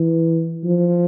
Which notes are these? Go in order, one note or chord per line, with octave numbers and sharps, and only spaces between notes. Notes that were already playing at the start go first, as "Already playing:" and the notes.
Already playing: E3
F3